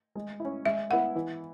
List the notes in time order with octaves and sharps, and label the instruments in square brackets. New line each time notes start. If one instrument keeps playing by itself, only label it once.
[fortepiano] G#3
C#4 E4
[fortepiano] G#3 [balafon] E5
[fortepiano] B3 E4 B4 E5 [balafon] F#5
[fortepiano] E3